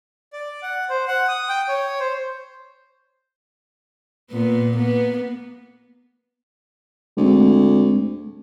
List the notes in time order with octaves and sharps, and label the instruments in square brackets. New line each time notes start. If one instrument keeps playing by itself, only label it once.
[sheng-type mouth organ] D5
F#5
C5
F#5
D#6
G5
C#5
C5
[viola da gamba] A#2 B3
A#3 B3
[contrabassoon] D2 [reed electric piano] G#3 A3 C4